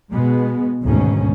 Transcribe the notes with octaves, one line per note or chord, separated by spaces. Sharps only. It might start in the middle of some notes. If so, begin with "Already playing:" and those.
B2 G#3 B3
D2 G#2 B2 D#3 C#4